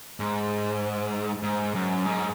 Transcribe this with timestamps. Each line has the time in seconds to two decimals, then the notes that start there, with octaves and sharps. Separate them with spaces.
0.20 G#2
1.43 G#2
1.75 F#2
2.06 G#2